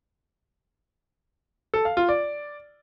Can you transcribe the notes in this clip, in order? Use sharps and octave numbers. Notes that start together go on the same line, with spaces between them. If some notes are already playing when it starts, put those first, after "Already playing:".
A4
F5
F4
D5